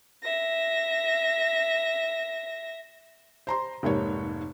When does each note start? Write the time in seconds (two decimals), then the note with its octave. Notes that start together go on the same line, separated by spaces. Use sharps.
0.23 E5 A#6
3.47 C5 A#5 C6
3.83 F1 G#2 A#3 C#5